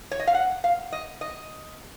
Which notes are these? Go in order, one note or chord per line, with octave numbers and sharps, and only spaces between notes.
C#5
D#5
F5
F#5
F5
D#5
D#5